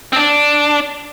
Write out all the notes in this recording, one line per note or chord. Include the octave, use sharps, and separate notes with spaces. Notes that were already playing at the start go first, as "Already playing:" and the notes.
C4
D4